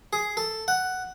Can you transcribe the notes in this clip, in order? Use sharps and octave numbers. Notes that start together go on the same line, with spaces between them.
G#4
A4
F#5